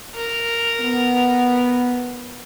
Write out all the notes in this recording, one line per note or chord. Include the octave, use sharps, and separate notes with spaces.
A#4
B3